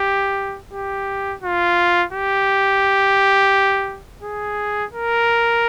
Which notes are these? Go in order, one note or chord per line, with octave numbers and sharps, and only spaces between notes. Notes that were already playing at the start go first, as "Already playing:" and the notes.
Already playing: G4
G4
F4
G4
G#4
A#4